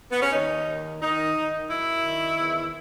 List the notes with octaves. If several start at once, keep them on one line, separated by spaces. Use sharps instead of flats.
B3
C#4
D#2 D#4
D#3
D#3 D#4
D#3
F#2 E4
D#3
E2